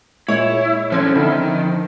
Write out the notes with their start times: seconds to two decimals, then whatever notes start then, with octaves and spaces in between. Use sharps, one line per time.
0.28 A#2 G#3 E4 C#5 C#6
0.92 D3 F3 C#4 C5 G#6
1.16 D3 D#3 C4 E4